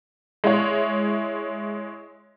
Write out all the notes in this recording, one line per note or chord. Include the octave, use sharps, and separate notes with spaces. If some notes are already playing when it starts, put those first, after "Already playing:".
G#3 E4 C#5